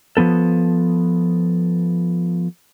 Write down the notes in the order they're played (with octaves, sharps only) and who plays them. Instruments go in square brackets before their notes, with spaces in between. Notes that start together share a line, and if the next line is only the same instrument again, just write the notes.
[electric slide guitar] F3 G3 B3 A4